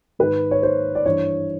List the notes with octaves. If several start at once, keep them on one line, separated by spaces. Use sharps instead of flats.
G#2 D#3 B4
C#5
C5
D5
G2 E3 C#5